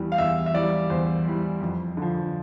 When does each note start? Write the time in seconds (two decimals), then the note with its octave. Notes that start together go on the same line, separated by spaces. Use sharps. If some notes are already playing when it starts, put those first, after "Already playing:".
Already playing: E2 E3 G3
0.12 F5
0.18 E2 E5
0.46 E5
0.54 E3 G3 D5
0.90 E2 C5
1.26 E3 G3
1.61 F2
1.97 D3 F3